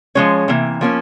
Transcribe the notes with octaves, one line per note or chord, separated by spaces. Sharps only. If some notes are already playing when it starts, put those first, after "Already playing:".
F3 G#3 C#4 C#5
C3 E3 A#3
F3 A#3 C#4